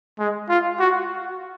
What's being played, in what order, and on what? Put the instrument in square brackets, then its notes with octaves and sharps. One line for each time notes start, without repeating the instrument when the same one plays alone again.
[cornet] G#3
F4
F#4